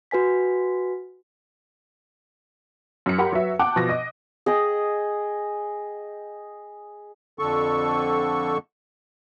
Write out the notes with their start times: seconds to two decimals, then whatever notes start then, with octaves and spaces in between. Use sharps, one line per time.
0.11 F#4 B4 G#5 B6
3.06 F#2 C#7
3.18 G4 A#4 F#5 B5 C6
3.32 F#3 F#4 B4 E5
3.59 F#5 G5 A5 D6 F#6
3.76 B2 F3 A#6
3.89 D#5
4.46 G#4 D#5 G5
7.39 F2 D3 A4 C#6